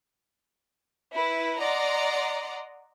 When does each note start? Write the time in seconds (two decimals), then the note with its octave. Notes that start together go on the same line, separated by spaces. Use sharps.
1.12 E4 B4
1.59 D5 D#5 F#5 A#5 C6